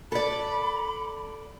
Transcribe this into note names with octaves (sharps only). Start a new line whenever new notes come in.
A4 D5 B5